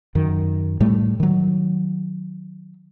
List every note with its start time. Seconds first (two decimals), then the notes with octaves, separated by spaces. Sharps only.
0.15 F#2 D#3
0.80 A2 G3 A3
1.20 D#3 F#3